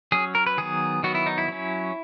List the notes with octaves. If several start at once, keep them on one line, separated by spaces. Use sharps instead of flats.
F#3 C#4 G#4
A#4
B4
D#3 F#3 B3 G#4
D#3 F#3 B3 F#4
E4
D#4
E4
F#3 C#4